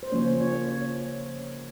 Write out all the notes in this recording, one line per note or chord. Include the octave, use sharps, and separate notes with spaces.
C5
C#3 F3 A#3 C#4 C#5
C#5
C#5